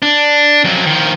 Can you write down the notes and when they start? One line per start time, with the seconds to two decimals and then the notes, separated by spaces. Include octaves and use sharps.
0.02 D4
0.64 F2 F#3
0.86 D#3 F3